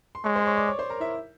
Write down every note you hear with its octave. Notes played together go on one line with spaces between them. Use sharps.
C6
G#3 C#5 C#6
C5 C6
C#5 C#6
D5 D6
C#5 C#6
C5 C6
A#4 A#5
E4 E5